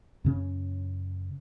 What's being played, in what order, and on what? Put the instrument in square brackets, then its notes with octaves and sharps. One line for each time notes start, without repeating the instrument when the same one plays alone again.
[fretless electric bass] F#2 C#3 C#4